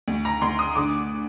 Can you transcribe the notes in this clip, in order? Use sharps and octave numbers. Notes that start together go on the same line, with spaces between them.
D2
A#5
D2 C6
D#6
D3 D6